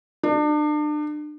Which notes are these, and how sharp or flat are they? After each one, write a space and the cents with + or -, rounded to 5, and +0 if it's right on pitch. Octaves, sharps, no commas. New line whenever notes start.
D4 +35